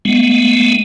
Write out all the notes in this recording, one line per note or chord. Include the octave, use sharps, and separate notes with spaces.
G#3 A3 B3